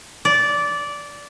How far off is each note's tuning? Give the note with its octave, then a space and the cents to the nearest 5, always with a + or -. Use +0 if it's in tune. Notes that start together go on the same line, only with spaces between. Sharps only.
D5 -15